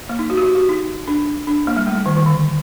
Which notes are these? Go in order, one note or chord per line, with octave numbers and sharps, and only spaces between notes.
A#3
D#4
F#4
G4
F#4
F#4
D#4
D4
D4
A#3
G3
A3
G3
D#3
D#3
D3